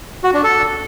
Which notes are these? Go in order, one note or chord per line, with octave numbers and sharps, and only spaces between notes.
F#4
D4
A4